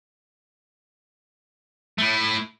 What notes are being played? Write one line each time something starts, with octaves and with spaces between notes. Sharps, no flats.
A3 E4